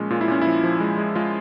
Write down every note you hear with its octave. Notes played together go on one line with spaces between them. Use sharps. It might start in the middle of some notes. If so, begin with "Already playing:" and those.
Already playing: A#2 F3 G#3 C#4
A#2 F4
E4
A#2 C#4
F3 E4
F3
G#3
G#3
G#3 F4